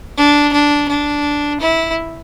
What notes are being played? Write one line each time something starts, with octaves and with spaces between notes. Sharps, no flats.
D4
D4
D4
E4